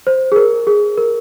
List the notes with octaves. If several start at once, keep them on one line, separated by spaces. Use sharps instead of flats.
C5
G#4
A#4
G#4
A#4